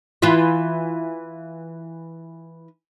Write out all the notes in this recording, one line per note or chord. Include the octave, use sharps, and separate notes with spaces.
E3 E4 F4